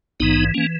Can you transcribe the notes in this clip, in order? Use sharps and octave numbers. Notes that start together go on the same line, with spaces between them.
A#1 G#2 E3 B3 D#4
E3 A#3 C#4